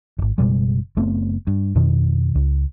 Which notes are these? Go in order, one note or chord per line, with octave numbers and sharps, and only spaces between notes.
D1 G#1
F#1 B2 G3 G#3
F#1 A3 B3 C4
G2
F2 B2 D#3
C#2